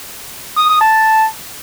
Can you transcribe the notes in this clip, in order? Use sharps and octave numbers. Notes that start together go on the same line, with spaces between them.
D#6
D#6
A5